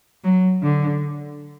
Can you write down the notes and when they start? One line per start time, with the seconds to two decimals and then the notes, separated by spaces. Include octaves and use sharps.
0.24 F#3
0.63 D3